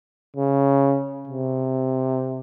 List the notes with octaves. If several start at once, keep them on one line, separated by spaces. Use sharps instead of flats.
C#3
C3